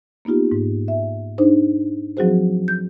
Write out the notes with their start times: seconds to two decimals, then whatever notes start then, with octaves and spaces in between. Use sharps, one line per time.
0.25 A#3 B3 D#4 F4 G4
0.52 G#2
0.88 E5
1.38 D4 D#4 G#4 C5
2.17 F3 F#3 C4 F#4 G#4 C5
2.68 G6